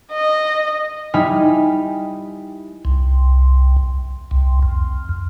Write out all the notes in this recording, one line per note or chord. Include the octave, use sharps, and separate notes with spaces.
D#5
G3 D#4 E4 G#5 B5 F6
C2
C2
F2